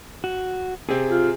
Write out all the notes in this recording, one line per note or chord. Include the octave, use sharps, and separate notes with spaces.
F#4
C3 C4 G#4
F4